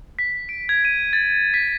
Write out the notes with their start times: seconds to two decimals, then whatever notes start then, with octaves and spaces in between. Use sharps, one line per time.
0.19 B6
0.49 D7
0.69 G#6
0.85 D#7
1.13 A6
1.54 B6